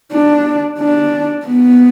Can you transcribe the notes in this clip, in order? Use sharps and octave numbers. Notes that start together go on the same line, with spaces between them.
D4
D4
B3